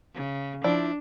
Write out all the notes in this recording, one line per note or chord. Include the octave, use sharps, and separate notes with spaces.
C#3
F3 D4 E4 D5